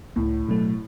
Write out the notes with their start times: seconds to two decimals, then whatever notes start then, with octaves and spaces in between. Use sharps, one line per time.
0.16 C#2 A2
0.49 B2 F#3 A3